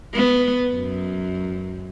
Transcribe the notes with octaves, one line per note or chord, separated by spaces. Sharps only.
B3
F#2